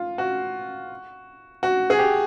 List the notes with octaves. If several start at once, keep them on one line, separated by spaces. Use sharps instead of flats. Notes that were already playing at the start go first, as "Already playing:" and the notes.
Already playing: F4
F#4
F#4
G#4
G4